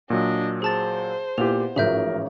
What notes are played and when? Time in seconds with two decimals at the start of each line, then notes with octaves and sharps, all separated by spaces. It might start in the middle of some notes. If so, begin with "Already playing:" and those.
0.10 A#2 F#3 D4 D#5
0.62 G#4 C5 A5 A6
1.38 A#2 B3 E4 G4 F7
1.76 A1 G#2 F3 F#4 G#4 A#4 E5 G6